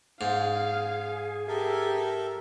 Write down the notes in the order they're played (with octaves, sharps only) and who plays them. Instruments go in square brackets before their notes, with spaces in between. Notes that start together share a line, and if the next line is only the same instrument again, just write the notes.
[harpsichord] G#2 [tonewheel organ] G#4 [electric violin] F5
[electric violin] G4 [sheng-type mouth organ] A4 A#4 E5